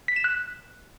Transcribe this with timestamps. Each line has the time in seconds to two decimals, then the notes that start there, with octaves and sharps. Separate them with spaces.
0.08 B6
0.16 E7
0.24 F#6